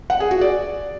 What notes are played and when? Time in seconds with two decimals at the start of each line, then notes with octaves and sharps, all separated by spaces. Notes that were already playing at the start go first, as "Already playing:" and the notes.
0.10 F#5
0.20 G#4
0.31 F#4
0.41 D5